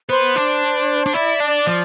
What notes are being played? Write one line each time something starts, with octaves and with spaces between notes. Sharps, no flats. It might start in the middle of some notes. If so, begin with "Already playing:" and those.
B3 C5
D4
D4
E4 D5
D4
F3